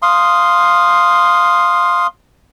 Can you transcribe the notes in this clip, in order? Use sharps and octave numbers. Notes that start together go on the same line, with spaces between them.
F5 C6 D#6